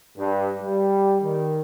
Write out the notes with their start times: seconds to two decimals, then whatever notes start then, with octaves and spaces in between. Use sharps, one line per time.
0.17 G2
0.61 G3
1.21 D#3